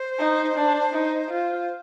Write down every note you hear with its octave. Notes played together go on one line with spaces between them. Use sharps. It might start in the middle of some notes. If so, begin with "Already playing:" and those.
Already playing: C5
D#4
D4
D#4
F4